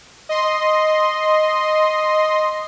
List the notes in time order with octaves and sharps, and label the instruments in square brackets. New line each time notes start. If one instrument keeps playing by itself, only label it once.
[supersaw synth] D#5 C6